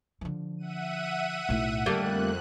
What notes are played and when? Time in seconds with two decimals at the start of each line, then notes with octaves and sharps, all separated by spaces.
0.21 D3 F3
0.58 E5 F#5 D#7
1.49 B1 A2
1.86 F2 D3 G3 A3 A#3 F#6